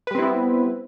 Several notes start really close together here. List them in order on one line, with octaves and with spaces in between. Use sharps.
B4 G3 C4 E4 B3